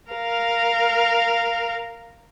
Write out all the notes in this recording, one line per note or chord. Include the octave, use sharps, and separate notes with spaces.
A#4 F5